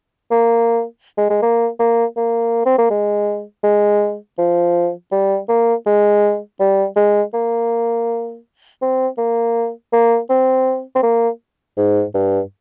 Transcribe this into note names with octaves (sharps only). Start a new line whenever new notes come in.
A#3
G#3
G#3
A#3
A#3
A#3
C4
A#3
G#3
G#3
F3
G3
A#3
G#3
G3
G#3
A#3
C4
A#3
A#3
C4
C4
A#3
G#2
G2